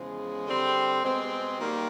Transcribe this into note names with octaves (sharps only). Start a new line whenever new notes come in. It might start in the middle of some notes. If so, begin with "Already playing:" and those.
Already playing: E2 C#3 F3 G#3
D3 G3 C4
B2 G#3 C4
D#3 G3 A#3